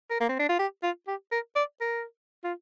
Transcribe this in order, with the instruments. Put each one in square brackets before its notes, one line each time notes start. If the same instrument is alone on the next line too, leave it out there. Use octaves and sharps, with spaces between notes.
[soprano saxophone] A#4
A#3
C4
D4
F4
G4
F4
G4
A#4
D5
A#4
F4